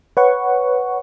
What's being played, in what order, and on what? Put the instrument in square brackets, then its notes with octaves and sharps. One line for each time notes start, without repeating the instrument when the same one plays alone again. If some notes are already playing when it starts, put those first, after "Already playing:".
[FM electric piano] B4 C#5 F#5 C#6